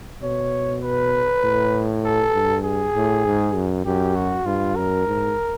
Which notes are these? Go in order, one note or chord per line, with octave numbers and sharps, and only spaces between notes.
B2 C#5
B4
A2
A4
G2
G#4
A2
G#2
F#2
F#2 G4
F#4
G2 F4
F#2 A#4
G#2